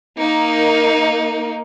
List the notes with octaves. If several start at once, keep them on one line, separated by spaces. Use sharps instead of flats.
A#3 D#4